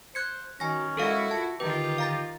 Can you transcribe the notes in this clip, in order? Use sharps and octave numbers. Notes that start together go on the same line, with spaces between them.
C5 F#6 G#6 C#7
D#3 C#4 F#4 G#5 A#6
G#3 E4 F#4 A4 A#4 F5
F4 A5
D3 D#3 F4 G4 B4
F5 A#5 A6